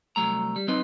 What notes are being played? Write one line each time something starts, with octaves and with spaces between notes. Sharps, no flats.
C2 G2 F#3 A3 A#5
G3
F#3 C4 D#4 B4 D#5